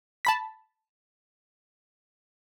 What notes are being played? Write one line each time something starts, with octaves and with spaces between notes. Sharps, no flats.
A5 B5 B6